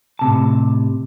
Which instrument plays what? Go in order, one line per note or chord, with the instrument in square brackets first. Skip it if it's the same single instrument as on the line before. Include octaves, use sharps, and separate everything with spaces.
[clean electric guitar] A2 C3 A5